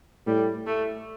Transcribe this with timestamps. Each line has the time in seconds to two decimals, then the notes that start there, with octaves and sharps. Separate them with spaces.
0.27 A2 G3
0.66 A3